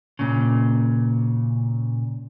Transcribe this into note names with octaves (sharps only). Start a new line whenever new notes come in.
A#2 C#3